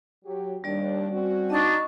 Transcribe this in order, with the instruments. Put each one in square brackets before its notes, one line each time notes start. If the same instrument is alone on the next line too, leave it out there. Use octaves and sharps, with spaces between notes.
[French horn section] F#3 G4
[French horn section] D#2 D4 [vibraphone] G3 D5
[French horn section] C4 C#4 F#4
[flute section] D4 D#4 A5 [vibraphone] D#5 C#6